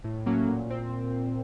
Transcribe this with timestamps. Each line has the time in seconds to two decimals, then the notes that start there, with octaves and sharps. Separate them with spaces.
0.04 A2
0.26 F#3 A#3 C#4
0.48 A#2
0.70 C4